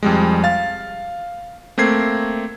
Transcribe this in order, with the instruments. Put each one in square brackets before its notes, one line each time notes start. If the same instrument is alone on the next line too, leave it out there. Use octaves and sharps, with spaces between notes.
[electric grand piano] F2 G3 G#3
F5 A6
A3 A#3 C4 G#6 C7